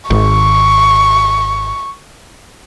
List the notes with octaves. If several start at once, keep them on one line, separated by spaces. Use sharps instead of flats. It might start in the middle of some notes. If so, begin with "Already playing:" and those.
G#1 C#6